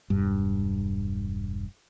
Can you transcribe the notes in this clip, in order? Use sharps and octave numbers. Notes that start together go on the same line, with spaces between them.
E1 G2